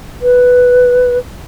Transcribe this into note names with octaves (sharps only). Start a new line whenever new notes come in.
B4